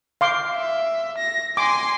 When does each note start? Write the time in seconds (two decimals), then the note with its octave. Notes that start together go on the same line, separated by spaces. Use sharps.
0.21 F5 C6 D6
0.55 E5
1.18 A#6
1.57 G#5 C6 D6